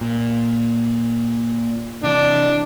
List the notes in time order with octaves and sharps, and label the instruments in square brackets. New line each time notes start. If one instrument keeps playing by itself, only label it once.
[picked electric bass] A#2
[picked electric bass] C3 E3 [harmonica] D4